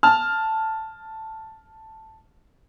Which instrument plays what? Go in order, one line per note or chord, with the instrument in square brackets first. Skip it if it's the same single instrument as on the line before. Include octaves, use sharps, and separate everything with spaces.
[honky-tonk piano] A5 F6